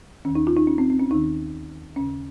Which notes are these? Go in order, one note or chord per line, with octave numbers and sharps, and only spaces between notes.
D#2 D#3 C#4
D#4
F4
D#4
C#4
C4
C4
C#4
D#2 D#3 D#4
D#2 C#3 C#4